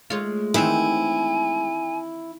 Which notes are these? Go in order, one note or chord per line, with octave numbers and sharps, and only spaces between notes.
G#3 A3 F4 C#5
D#3 E3 C4 E4 G#5